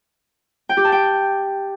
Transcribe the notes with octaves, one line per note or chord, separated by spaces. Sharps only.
G5
G4
A5
G5